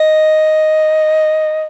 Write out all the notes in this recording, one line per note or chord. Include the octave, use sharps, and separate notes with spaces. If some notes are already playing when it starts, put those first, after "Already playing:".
Already playing: D#5